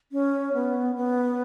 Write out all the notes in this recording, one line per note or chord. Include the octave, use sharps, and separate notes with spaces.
C#4
B3
B3